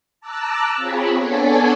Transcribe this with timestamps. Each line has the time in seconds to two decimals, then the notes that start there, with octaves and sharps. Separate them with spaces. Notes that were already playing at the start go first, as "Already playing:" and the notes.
0.20 A5 A#5 D6 E6 F#6
0.76 C4 F4 G#4 C#5 B5
1.17 B3 D4 A4 C#5 D5 G#5